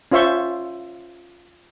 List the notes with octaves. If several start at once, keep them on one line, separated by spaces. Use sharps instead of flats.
C#4 F4 C5 E5 C6 C#6